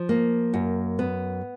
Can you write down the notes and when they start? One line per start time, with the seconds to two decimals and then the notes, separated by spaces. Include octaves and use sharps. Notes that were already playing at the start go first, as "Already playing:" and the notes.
Already playing: F3
0.09 A#3
0.54 F#2
0.99 B3